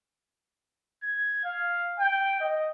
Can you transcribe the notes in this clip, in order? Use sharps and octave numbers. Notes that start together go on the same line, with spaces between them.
G#6
F5
G5
D#5